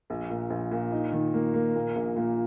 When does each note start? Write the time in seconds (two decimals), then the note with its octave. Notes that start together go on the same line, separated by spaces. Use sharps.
0.10 A#1
0.30 A#2
0.50 A#1
0.71 A#2
0.92 D#4
1.12 D#3
1.34 A#3
1.54 A#3
1.75 A#2
1.96 A#1
2.17 A#2